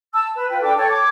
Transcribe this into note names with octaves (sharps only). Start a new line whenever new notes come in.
A5 E6
B4
F4 B4 G5
D4 A4 G5 D6
A4 C#5 G5
D6 G#6